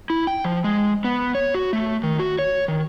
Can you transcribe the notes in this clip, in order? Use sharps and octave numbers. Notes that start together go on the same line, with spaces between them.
E4
G5
F3
G#3
B3
C#5
F#4
A3
D#3
F#4
C#5
D#3